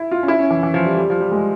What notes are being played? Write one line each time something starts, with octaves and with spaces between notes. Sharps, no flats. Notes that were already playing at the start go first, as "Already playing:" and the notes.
Already playing: E4
F4
C#4
E4
C#4
E3
E3
F3
G3
G3
F3
G3
G#3